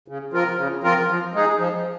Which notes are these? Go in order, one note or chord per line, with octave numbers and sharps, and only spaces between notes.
C#3
F3 C4 F4 A#4
C#3
F3 C4 F4 A#4
F3
G#3 D#4 G#4
F3